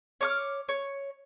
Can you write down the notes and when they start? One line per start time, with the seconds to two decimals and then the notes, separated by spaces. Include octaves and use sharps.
0.21 C#5 D6 F6
0.69 C#5